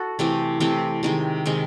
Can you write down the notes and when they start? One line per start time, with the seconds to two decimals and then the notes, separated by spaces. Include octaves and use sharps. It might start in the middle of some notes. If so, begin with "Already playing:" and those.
Already playing: F#4 A4
0.19 C3 E3 A3 C4
0.60 C3 E3 A3 C4
1.03 C3 D#3 G#3
1.46 C3 D#3 G#3